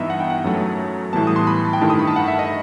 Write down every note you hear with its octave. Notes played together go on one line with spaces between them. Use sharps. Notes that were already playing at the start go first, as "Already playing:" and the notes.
Already playing: G2 E3 B3 D#4 D#5 E5
F#5
G5
F#5
F#2 F#3 A3
A2 E3 G3 B3 A5
D#6
C6
B5
A5
G5
G2 D#3 A3 E4 A5
D#6
B5
A5
F#5
E5
D#5